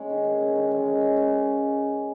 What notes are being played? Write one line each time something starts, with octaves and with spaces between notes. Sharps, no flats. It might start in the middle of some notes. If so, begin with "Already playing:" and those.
Already playing: G#3 C#4
D#3
G#4
C#4
D#3
G#3
C#4
C#4
C#3